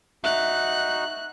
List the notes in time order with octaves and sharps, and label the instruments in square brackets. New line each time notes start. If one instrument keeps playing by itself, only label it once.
[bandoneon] D#4 F#4 [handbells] E5 [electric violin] F#6